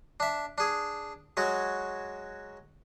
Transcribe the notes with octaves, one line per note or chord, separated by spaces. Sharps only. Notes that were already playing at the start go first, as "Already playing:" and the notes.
D4 E5
D4 G#4
F#3 G#3 F#4